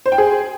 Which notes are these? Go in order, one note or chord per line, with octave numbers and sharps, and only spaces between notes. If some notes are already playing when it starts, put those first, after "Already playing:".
C5
G5
G#4